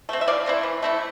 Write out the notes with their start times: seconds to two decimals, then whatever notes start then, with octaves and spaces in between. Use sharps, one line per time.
0.09 A3 C4
0.21 E5
0.27 E3 D5 F5
0.46 A3 C4 E4
0.63 E3
0.82 A3 C4 E4